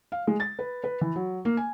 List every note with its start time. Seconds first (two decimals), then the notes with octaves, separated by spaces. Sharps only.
0.12 F5
0.27 G#3
0.40 A6
0.59 B4
0.84 B4
1.01 E3
1.16 F#3
1.45 A#3
1.57 G#5